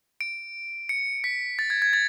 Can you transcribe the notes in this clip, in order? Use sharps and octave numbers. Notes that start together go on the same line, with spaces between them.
D7
C#7
B6
A6
G#6
G#6
A6